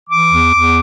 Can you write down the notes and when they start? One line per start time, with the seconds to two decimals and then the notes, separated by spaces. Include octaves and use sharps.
0.10 E3 D6
0.31 E2
0.52 E2